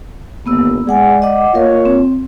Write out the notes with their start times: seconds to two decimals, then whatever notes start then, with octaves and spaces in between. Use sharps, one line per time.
0.46 G1 D#2 A#3 B3 E6
0.87 G#3 G#4 D5 F#5 G#5
1.22 D#5 F#5 D6
1.54 A#3 F4 A#4 C#5 D#5 F5
1.85 C4